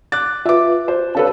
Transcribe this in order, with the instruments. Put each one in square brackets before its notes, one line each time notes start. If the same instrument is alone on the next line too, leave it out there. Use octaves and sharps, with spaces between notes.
[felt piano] D6 F#6 A6
[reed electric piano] F4 B4 [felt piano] E5 D6
[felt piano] C5
[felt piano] D4 A4 B4 [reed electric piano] C#5 F5 A5